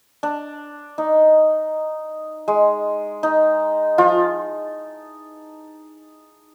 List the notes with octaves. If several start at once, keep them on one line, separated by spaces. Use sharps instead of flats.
D4
D#4
G#3
D#4
F3 F4